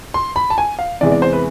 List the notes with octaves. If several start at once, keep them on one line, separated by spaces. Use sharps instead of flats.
C6
B5
A5
G#5
F5
E2 C3 E3 G#3 D5
D5
C5
B4